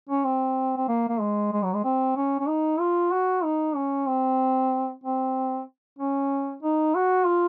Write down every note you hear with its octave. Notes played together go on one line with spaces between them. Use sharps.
C#4
C4
C4
A#3
A#3
G#3
G#3
F#3
G#3
C4
C#4
C#4
D#4
F4
F#4
D#4
C#4
C4
C4
C#4
D#4
F#4
F4